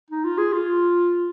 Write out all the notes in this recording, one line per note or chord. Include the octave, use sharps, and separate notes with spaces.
D#4
F4
G#4
F4